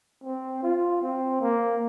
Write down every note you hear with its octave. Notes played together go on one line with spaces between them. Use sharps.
C4
F4
C4
A#3